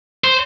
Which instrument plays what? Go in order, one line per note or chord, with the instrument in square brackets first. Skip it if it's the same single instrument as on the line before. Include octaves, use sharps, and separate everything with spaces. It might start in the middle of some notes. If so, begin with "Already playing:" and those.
[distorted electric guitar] C5